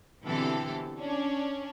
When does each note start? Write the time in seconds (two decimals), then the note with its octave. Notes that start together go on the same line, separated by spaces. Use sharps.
0.25 B2 D3 E3 C4 G4 A4
0.99 C#4 D4